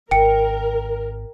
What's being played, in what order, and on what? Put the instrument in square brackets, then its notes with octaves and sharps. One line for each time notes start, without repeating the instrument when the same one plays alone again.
[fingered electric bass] G#1 [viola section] A#4 [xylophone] G5 C#7